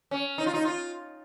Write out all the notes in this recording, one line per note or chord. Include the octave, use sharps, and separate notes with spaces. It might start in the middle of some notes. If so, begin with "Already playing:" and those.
C#4
D#4
F4
D#4
F4